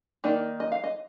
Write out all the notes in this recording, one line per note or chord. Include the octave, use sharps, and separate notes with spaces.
D#3 A#3 D#4 D5
D#5
F5
D#5